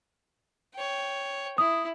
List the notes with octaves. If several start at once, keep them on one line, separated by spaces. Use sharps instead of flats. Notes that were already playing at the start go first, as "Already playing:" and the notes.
C#5 G5
E4 D#6